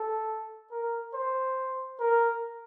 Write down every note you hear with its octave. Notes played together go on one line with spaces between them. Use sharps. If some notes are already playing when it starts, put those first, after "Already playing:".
Already playing: A4
A#4
C5
A#4